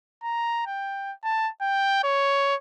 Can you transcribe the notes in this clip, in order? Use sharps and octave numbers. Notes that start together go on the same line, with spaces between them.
A#5
G5
A5
G5
C#5